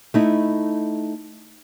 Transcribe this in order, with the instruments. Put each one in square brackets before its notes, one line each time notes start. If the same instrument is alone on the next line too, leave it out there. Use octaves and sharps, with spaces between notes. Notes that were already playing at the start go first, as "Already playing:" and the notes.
[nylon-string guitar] A3 D#4 E4